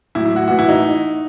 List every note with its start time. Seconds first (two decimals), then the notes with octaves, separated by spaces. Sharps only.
0.15 A2 F#3 E4
0.26 E4
0.36 F#4
0.48 A2 E3 F#4
0.59 E4
0.69 D#4